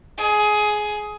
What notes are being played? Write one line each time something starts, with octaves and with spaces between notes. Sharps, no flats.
G#4